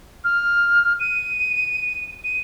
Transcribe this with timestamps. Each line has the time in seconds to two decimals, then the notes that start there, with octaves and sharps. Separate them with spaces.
0.24 F6
0.99 D#7
2.24 D#7